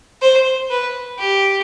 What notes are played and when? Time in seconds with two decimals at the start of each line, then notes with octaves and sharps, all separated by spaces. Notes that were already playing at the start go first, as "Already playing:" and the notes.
0.22 C5
0.70 B4
1.18 G4